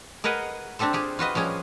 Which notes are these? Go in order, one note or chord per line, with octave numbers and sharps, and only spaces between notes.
G#4 A#4 B4 D#5 F#5
C4 D4 G4 A4 C5
F4 G4 G#4
F4 F#4 B4 D#5
F3 G3 C#4 G#4